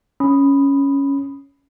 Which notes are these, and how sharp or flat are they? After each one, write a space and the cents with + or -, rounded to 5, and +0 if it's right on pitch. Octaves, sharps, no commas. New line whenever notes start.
C#4 +0 B5 +0 D#6 +0